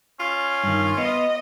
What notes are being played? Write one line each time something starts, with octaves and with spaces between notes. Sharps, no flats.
C#4 F4
G2 D#3
B3 D#5